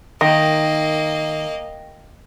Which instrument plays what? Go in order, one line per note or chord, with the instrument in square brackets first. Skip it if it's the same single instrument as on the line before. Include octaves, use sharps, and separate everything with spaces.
[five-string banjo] D#3 [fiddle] A#3 D#5 [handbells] G5 A#6